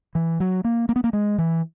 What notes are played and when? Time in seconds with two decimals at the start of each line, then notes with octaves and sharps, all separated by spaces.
0.15 E3
0.40 F#3
0.64 A#3
0.89 A#3
0.96 B3
1.04 A#3
1.13 G#3
1.38 E3